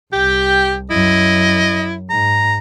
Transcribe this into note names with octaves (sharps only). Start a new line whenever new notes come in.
C2 G4 G5
F#2 E4 D#5
G#2 A#5